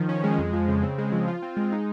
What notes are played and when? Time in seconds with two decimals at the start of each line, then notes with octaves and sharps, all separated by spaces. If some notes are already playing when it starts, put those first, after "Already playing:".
Already playing: D#3 F3
0.09 C#4
0.24 G#3
0.38 F2
0.53 F3
0.68 C#3
0.83 C4
0.98 G#3
1.12 F3
1.28 F4
1.42 C4
1.57 G#3
1.72 D#4